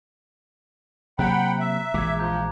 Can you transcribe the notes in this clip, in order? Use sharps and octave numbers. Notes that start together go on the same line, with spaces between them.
C3 F#3 A#3 F#5 G5 A#5 B5 F#6
E5
A#1 E3 G#3 D6 G#6
F3 A#5 G6